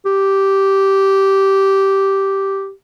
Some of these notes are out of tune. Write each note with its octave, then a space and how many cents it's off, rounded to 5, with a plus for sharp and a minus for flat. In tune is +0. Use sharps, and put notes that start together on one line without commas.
G4 -10